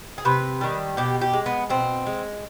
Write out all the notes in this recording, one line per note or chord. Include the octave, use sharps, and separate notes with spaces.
G#4
C3 B4
D#3 G3
B2 G4
G4
G#3
B3
B2 C4
G#3